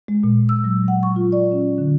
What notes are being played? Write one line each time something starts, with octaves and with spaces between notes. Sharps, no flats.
G#3
A#2
E6
F#3
F#5
C#6
F4
D5
C#4
D3